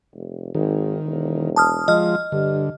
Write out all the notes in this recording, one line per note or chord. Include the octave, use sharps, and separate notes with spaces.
F1
G#1 D#3
E1
A5 D#6 F6
F3 G#3 F4 D#5 F6
G2 D3